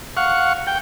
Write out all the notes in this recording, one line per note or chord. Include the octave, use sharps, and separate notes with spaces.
F5 F#5 C#6
G5